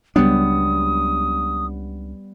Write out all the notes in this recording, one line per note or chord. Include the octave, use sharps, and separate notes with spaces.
C#2 F#3 G3 B3 D4 D#6